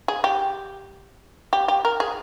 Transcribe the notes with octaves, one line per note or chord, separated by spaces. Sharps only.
G#4
G4
G4
G4
A#4
G#4